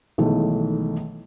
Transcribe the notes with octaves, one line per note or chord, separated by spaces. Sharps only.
B1 D#3 E3 G#3 A3